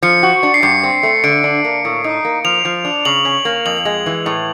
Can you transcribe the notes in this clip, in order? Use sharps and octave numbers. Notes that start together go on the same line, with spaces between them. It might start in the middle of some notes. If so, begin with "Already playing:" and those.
F3 C#7
F#4
D4
C7
G2 C#7
C4
A3
D3 D7
D4
A#3
A2
D#4
A#3
F3 F7
F3
D4
C#3 F#7
C#4
A#3
F2 F#7
G#3
E3
A2